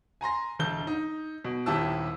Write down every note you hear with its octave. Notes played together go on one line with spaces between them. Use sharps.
G#5 A#5 C6 A#6
E1 D3 A5 G6 G7
D#4
B2
D#1 D#2 E4 G4 A5 E6